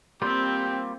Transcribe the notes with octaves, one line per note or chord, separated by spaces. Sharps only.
G3 A#3 C4 F4 G4